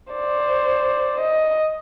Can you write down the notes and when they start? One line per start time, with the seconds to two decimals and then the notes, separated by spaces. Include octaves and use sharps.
0.13 C5 D5
1.20 D#5